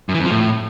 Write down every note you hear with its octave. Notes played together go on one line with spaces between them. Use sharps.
F#2
E3
F2
F3
A2